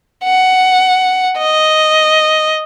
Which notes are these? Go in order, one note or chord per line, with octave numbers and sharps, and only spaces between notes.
F#5
D#5